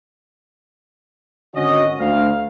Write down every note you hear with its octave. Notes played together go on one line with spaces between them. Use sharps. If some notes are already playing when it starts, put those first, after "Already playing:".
G#1 D3 C#4 F#4 D#5
D2 F5